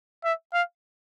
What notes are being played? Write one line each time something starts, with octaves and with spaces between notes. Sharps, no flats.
E5
F5